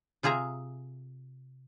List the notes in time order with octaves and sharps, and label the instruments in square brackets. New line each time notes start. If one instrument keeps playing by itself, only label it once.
[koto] C3 F4 G#4 E5 A#5